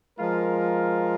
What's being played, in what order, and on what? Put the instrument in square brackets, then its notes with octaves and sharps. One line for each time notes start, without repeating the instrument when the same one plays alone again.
[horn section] F3 G#3 F4 A#4